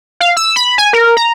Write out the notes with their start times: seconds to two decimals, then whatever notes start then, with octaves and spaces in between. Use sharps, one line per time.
0.20 F5
0.37 E6
0.56 B5
0.78 G#5
0.93 A#4
1.17 A#5